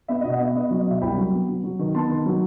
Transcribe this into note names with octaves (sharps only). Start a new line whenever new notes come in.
B3 E5
D#5
B2
D#5 F#5
B3 E5
B3 D#5
D#5
F#3
D#5
B2 E5
C2 G5 B5
F#3
B3
F#3
F#3
D#3
B3 A5 C6
D#3
F#3